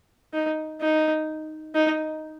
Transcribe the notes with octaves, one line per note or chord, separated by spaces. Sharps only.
D#4
D#4
D#4